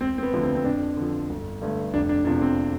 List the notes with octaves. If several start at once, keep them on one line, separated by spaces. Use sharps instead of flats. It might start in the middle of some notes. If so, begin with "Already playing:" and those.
E1 C4
C4
B3
D2 D3 F3
C4
C4
F2 D4
D3 F3
G1
G2 D3 A3
F1 D4
D4
E2 C3 F3 D4
C4